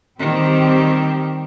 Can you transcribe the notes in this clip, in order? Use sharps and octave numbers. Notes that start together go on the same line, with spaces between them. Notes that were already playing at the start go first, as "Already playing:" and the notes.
D#3 G3 C4 G4